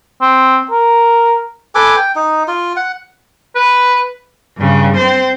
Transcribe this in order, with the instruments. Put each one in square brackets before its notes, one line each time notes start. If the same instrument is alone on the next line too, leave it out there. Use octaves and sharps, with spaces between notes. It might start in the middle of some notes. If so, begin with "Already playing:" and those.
[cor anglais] C4
A#4
[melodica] A4 B4 G#5 D6
G5
D#4
F4
F#5
[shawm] B4
[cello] G2 C#3
C4 C5